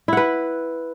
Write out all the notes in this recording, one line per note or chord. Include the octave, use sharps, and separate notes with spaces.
E4 B4 F#5